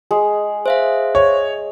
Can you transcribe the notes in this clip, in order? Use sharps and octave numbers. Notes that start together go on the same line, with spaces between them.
G#3
C5 E5 F5
C#5